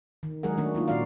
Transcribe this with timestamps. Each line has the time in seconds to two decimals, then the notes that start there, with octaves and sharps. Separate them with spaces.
0.23 D#3
0.43 F#3 G#3 G#4 A#4 F#5
0.57 D#3 A3 D4 F#4
0.75 A#3 D#4 F4
0.88 A#2 A#3 C#4 F#4 D5 F5